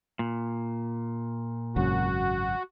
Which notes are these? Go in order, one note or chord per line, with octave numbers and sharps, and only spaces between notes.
A#2
G#1 F#2 C#3 F#4